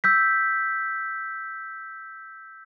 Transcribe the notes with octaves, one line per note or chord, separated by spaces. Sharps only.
E6 G6 B6